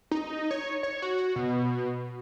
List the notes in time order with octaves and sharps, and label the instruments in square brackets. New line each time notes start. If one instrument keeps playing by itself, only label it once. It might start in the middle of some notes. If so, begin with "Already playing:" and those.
[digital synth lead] D#4
C#5
C#5
F#4
B2